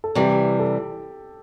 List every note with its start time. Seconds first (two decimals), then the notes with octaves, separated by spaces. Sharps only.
0.04 A4
0.15 C3 E3 G3 G4
0.59 A4